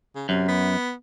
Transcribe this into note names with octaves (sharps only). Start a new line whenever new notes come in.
C#3
F#2 C3
B3